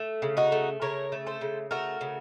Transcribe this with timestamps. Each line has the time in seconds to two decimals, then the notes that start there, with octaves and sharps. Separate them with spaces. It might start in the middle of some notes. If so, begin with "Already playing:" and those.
Already playing: A3
0.22 C#3
0.37 D#4 F#4
0.52 A3
0.82 C#3 A#4 C#5
1.12 A3
1.26 A4 C5
1.41 C#3
1.71 A3 F#4 A#4
2.01 C#3